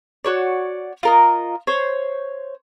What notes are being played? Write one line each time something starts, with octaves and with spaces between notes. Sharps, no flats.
F#4 C#5 D5
F4 A#4 D#5
C5 C#5